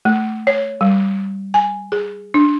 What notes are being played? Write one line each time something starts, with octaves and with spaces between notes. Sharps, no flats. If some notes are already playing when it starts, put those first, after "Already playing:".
A3
C#5
G3
G#5
G#4
D4